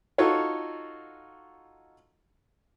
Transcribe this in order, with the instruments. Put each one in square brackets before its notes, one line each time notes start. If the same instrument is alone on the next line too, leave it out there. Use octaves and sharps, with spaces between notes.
[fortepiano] D#4 F4 F#4 A4 C#5